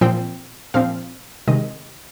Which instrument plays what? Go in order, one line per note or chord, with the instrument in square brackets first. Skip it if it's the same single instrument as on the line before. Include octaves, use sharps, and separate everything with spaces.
[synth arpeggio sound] A#2 F3 C4 G5
A#2 F3 C4 F5
C3 D#3 G#3 D#5